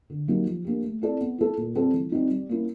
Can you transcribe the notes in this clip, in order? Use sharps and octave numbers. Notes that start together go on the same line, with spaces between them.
D3
F#3 A#3 D#4 G4
F3
A#3 D4 G4
A3
C4 E4 A4 D5
B3
E4 A4
A#2
G3 C4 F4 A4
E3
G3 C4 D#4
G3
A#3 C#4 E4